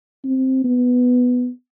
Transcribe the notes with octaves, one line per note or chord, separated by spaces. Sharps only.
C4
B3